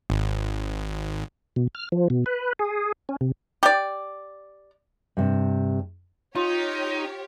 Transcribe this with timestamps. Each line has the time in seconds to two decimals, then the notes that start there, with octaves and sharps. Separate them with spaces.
0.10 G#1
1.56 B2
1.75 F6
1.92 F3
2.10 B2
2.26 B4
2.59 G#4
3.09 C#4
3.21 C3
3.63 G4 D5
5.17 G2 C3
6.35 D#4 F4 G4 C#5